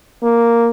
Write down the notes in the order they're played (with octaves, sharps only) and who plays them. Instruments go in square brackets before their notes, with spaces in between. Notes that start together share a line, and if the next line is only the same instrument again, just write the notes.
[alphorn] A#3